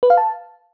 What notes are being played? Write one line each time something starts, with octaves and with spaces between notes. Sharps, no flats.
B4
F5
A5